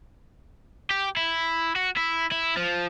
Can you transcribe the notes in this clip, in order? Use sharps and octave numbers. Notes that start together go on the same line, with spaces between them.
G4
E4
F#4
E4
E4
F3